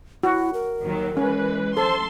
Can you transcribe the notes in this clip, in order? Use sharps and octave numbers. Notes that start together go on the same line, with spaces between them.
E4 F#4
A#4
D#2 D#3 F#3
E3 G#3 C#4 B4
A4 C5 A5 C6